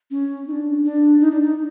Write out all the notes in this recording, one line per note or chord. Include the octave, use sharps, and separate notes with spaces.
C#4
D#4
D4
D4
D#4
D4
D#4